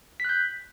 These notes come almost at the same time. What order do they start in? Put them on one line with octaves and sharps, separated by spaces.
B6 F#6 G6